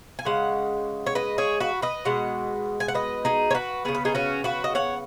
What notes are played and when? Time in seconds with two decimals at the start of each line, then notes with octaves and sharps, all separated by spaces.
0.19 G#5
0.25 C#3 G#3 F#5
1.06 C#5
1.15 B4 D#5
1.38 G#4 C#5
1.60 F#4 B4
1.82 B4 D#5
2.05 B2 G#3 F#5
2.80 G#5
2.88 F#5
2.94 B4 D#5
3.25 D#4 G#4
3.51 C#5
3.55 F#4 B4
3.85 C#3 B3 G#4
3.95 B4
4.05 D#4 G#4
4.15 C#4 F#4
4.44 F#4 B4
4.64 D#5
4.75 C#5 F#5